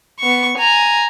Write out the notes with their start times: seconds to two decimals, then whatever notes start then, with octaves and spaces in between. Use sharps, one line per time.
0.19 B3 C#6
0.58 G#5 A#5